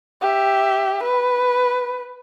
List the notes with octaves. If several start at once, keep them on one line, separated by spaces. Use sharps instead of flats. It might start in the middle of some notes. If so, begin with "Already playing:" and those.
G4 E5
B4